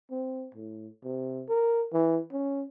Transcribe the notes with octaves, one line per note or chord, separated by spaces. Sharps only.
C4
A2
C3
A#4
E3
C#4